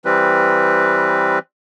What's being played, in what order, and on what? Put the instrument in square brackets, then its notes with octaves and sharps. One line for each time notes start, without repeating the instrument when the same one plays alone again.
[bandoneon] E3 G3 C4 B4